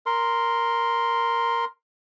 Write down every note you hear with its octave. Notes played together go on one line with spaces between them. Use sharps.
A#4 C6